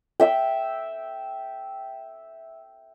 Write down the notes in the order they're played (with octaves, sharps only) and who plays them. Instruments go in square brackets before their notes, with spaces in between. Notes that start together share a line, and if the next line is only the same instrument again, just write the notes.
[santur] E5 G5